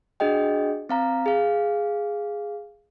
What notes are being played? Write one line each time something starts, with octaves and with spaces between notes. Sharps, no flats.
D4 F#4 G#4 D#5 G5
C4 F5 A#5
G#4 F5